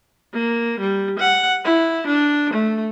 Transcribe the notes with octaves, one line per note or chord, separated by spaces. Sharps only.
A#3
G3
F#5
E4
D4
A3